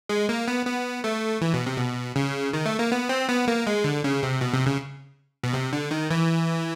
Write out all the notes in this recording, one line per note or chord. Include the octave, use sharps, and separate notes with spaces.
G#3
A#3
B3
B3
A3
E3
B2
C3
B2
C#3
D#3
A3
A#3
B3
C4
B3
A#3
G#3
D3
C#3
C3
B2
C3
C#3
B2
C3
D3
D#3
E3